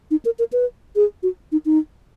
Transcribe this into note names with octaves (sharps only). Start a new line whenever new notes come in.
D#4
A#4
A#4
B4
G#4
F#4
D#4
D#4